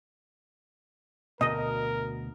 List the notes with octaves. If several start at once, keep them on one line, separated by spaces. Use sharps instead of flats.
D2 B2 A#4 D#5